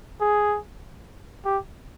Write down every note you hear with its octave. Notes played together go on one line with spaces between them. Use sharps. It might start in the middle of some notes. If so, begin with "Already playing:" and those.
G#4
G4